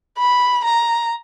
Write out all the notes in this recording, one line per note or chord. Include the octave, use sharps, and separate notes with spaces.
B5
A#5